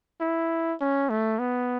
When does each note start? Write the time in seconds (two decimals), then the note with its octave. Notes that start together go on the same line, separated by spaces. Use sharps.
0.21 E4
0.81 C#4
1.10 A3
1.39 B3